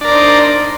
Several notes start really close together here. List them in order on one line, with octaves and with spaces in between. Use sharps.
D4 A#4 D5 C5 D#4